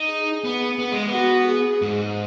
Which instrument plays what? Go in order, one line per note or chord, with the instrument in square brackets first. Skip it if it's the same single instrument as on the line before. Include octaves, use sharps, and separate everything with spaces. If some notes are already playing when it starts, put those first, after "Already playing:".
Already playing: [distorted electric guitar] D#4
[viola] G#4
[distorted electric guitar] B3
B3
G#3
B3
[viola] F#4
G#4
[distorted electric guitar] G#2